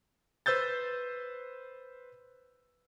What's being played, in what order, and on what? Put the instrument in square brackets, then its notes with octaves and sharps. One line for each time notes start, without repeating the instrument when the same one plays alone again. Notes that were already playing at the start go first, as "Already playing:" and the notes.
[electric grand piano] B4 C5 E6 G6 A6